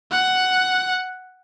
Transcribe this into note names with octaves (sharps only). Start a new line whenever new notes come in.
F#5